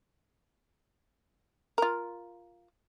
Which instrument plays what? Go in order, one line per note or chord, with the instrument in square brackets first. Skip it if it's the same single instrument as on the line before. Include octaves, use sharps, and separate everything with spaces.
[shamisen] F4 A#4